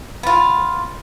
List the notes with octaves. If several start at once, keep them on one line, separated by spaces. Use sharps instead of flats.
B3 F4